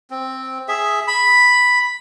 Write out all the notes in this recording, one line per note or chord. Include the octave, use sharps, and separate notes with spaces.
C4
G#4 E5
B5